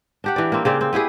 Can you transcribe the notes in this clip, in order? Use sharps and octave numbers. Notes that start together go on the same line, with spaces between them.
D4 G4 F#5
E3 D5
A#3 C4
C#3 C4 D5
C4
B3 E4 G4 G#4